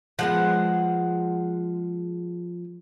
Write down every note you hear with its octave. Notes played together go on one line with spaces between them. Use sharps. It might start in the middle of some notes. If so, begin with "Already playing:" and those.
F3 G#3 B3 F#5